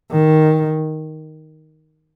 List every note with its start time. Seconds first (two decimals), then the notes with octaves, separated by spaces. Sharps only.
0.11 D#3